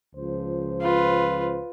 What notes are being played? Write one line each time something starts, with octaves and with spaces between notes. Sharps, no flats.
C#2 F3 C5
F4 B4